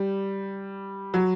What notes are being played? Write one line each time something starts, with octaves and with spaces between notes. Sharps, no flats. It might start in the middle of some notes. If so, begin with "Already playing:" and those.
Already playing: G3
F#3